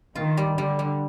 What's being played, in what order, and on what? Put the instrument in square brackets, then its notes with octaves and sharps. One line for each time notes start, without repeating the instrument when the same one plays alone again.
[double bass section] D#3 [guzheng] F4
[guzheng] G3
[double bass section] D3 [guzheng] G3
[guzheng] G3